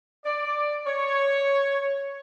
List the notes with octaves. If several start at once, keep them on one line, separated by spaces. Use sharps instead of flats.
D5
C#5